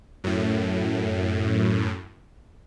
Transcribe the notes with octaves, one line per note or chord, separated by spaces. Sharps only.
F#2 A2